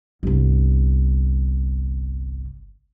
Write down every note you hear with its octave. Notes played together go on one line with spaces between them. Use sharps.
G1 C2